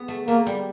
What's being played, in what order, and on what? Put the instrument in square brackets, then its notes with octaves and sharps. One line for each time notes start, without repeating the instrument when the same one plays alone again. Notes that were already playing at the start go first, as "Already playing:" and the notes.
Already playing: [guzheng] B3
A3
[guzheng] A3 [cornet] A#3
[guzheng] G3